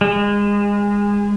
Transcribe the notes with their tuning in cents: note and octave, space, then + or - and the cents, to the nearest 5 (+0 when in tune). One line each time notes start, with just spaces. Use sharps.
G#3 -25